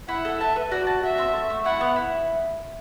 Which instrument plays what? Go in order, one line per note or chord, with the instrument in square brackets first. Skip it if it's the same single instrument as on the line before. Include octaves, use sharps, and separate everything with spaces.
[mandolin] E4 [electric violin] F#5
[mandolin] A4
[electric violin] E5 [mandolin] A5
[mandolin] B4
[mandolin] F#4 [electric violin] D5
[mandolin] A5
[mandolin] F#4 [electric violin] E5
[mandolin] C4
A3
A3
[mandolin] E4 [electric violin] F#5
[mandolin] B3
E4